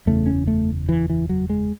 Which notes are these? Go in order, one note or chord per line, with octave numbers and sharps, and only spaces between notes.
F#1 E2 C#3 A3
C#4
A3
E3
E3
F#3
G#3